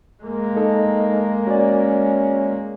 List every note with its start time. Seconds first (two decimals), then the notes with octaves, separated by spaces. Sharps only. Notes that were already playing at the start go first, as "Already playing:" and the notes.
0.23 G#3 A#3
0.56 D#4 A4
1.47 C#4 F#4 D5